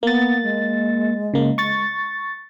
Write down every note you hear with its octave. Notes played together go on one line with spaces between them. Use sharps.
A#3 B3 A6
G#3
C#3 A#3
C#6 A6